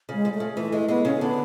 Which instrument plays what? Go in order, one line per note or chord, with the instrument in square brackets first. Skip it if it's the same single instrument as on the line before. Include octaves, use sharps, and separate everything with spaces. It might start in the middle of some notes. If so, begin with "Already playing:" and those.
[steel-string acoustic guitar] C#3 [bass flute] G#3
[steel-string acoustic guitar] C#3
[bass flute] A3
[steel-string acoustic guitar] C#3
[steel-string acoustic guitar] E3 [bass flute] A3
[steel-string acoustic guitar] G#3 [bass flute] A3
[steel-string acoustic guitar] G#3 [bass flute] B3
[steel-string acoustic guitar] C#3 [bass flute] C#4
[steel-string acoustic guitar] D3 [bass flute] B3